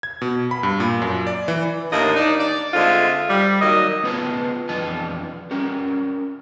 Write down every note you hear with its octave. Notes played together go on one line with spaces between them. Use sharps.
G#6
B2
B5
G2
A#2
F#2
D5
E3
D#2 A2 A#3 D4 D#5
D#3 D4 D#4
D5
D3 G#3 A3 C4 F4
G3
D#3 F#3 A#3 D#5
B3 F4 B4 C5 G5 A5
F2 E3 D4 D#5 A5
C#4 G4 A#4